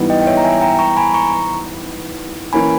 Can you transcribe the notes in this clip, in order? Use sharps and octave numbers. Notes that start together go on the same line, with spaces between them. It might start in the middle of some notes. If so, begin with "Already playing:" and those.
Already playing: G#2 E3 G3 B3
D#5 G5
G5
C#5 E5
A#5
E5 G#5
G5 A#5
A#5 C#6
A#5
G#5 B5
A#5 C#6
E3 A#3 C#4 G#5 B5